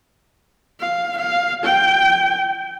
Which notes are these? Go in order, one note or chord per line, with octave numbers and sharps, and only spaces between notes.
F5
F5
G5